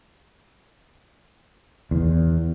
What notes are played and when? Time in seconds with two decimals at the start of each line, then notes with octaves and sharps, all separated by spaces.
1.91 E2